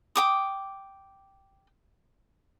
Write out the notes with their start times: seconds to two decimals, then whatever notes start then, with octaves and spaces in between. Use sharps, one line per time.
0.16 G5 D6 D#6